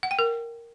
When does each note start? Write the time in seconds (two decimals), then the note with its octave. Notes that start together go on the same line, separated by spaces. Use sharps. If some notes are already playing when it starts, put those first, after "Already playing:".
0.03 F#5
0.11 G5
0.19 A#4